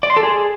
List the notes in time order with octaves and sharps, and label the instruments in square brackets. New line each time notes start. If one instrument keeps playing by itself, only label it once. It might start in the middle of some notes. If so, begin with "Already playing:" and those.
[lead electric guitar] D5
C6
A4
G#4